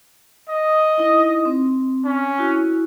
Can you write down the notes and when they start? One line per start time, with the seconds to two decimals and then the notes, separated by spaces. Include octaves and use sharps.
0.49 D#5
0.98 D#4 E4
1.45 C4
2.05 C#4
2.38 E4 F#4